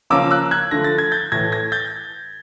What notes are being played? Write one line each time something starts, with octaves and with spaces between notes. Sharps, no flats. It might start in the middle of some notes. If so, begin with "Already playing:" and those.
C#3 F3 A#3 C#4 D6 E6
E6 F#6
F#6 G#6
D3 F3 A3 A#6
A6
G#6
G6 A6
A2 E3 A3 G#6 A#6
G#6 A#6
G6 A6